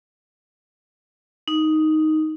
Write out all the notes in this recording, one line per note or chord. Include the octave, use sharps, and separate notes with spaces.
D#4